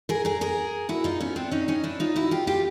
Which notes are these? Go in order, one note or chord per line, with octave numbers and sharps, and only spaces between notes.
G#4 A#4
G#4 A#4
G#4 A#4
E4 F#4
D#4 F4
B3 C#4
C4 D4
C#4 D#4
C#4 D#4
D4 E4
D#4 F4
E4 F#4
F4 G4
F4 G4